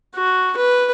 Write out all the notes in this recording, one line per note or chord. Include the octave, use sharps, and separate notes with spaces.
F#4
B4